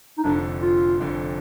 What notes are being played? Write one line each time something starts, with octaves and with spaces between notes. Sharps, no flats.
D#4
F1 F2 D3 D4
F4
F1 F2 D3